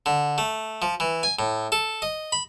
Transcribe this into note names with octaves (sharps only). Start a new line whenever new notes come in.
D3
A3
F3
E3
G#5
A2
A4
D#5
B5